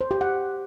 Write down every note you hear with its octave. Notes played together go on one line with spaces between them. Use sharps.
C5
G4
F#5